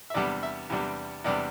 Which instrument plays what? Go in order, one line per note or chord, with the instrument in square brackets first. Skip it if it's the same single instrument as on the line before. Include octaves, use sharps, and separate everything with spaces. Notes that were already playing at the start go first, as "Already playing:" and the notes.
[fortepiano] E5
E2 C3 G3 B3 D4 D5
E5
E2 C3 G3 B3 D4
E2 C3 G3 B3 D4 D5